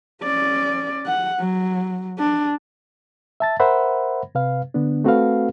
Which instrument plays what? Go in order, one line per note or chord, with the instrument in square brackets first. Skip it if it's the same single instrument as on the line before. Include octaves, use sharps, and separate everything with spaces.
[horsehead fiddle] C#4 D5
F#5
F#3
D4
[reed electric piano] E5 A5 A6
A#4 C5 E5 F#5 B5
C3 B4 F5
D3 B3 D4
A3 C4 F#4 A4 B4 F5